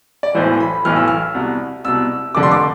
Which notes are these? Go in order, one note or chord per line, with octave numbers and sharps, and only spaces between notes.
D5
B1 A2 E3 C5
B5
B1 A2 E3 F6
E6
F6
C2 B2
C2 B2 E6
F1 F2 D3 D6
C6
D6